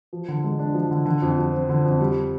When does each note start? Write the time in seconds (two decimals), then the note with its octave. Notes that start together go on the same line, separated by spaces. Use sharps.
0.13 F3
0.28 D3
0.44 G#3
0.59 D4
0.74 F3
0.91 D3
1.06 D3
1.22 F2
1.38 F3
1.53 C4
1.69 D3
1.84 F2
2.01 G3